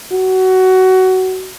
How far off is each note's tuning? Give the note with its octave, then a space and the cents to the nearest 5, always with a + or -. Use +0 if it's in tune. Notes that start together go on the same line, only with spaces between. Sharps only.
F#4 +20